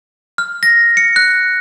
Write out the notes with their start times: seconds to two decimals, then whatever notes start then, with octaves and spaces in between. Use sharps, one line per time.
0.38 F6
0.63 A#6
0.97 C#7
1.16 F#6